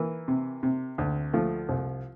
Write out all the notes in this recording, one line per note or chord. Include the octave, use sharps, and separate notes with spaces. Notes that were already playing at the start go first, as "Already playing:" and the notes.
Already playing: E3 A#3
C3
C3
D2
F3 A3
C2